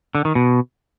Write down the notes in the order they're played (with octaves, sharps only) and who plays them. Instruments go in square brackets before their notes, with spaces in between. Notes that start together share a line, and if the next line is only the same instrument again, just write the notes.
[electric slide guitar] D3
D#3
B2